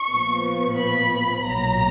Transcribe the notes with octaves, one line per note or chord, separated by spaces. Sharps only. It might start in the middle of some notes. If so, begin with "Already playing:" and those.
Already playing: C#6
A#1 A#2 F3 B3
B5
B1 A#2 F#3 A#5